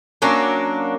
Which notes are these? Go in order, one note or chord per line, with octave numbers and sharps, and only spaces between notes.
F#3 A#3 C#4 D4